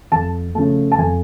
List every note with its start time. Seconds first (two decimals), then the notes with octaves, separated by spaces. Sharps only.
0.12 F2 A5
0.55 C#3 F3 A3 A5
0.92 A5
0.98 F2 G#5